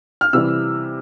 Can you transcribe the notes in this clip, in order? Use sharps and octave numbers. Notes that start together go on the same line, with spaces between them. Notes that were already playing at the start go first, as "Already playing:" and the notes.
F6
C3 E3 G3 E6